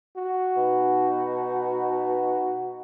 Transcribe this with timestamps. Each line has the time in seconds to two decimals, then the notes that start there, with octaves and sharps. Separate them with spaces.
0.16 F#4
0.56 B2 D#4